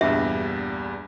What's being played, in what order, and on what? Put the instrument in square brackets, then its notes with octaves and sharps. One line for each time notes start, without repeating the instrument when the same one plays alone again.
[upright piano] A#1 E2 G2 [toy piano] E5